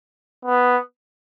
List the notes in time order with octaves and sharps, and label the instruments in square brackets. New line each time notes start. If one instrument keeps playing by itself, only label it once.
[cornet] B3